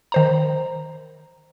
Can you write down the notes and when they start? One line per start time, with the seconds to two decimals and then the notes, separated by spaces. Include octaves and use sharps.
0.12 D#3 C5 A#5